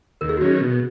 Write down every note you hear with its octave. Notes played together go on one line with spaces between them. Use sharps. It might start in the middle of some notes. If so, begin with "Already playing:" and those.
D#2 A#4
G#4
F#4
D#3 F#3 C#4 G#4
B2